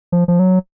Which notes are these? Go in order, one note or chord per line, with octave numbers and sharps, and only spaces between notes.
F3
F3
F#3